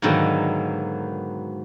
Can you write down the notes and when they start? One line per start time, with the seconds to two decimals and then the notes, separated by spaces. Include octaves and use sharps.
0.02 G#2 B2 D3 D#3 F#3 A#3